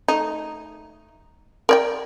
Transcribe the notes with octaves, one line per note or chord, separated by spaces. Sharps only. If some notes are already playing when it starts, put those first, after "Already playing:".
A3 D#4
A#4 D5 G5